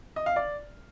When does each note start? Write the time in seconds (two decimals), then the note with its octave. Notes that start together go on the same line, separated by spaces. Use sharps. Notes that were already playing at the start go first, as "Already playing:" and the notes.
0.16 D#5
0.26 F5
0.36 D5